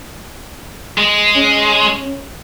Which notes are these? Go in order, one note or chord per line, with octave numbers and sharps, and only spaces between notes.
G#3
C#4